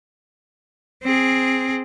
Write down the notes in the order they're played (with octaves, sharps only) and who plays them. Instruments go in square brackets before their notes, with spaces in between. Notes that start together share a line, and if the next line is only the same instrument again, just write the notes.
[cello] C4 G#4